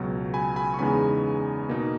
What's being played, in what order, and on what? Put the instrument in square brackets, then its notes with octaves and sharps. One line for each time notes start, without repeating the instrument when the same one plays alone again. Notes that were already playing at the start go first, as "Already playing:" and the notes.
Already playing: [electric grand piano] C#2 B2 F#3
G#5 B5
G#5 B5
C#6
E2 C#3 G#3 B3 D#4 G#5 B5
B2 A#3 D#4